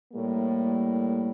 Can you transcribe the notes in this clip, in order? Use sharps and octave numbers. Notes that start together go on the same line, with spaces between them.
A2 G3 A#3